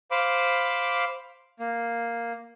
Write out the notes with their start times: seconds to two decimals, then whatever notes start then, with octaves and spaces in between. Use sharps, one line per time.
0.11 C5 F5 B5 D6
1.60 A#3